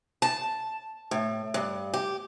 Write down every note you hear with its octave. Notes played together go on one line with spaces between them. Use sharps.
A5
A2
G2
G4